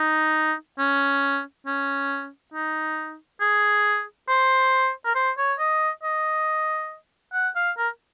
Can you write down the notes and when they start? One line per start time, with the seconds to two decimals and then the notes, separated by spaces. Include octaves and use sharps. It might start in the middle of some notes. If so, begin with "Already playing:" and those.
Already playing: D#4
0.79 C#4
1.67 C#4
2.54 D#4
3.41 G#4
4.28 C5
5.05 A#4
5.15 C5
5.38 C#5
5.59 D#5
6.03 D#5
7.33 F#5
7.56 F5
7.78 A#4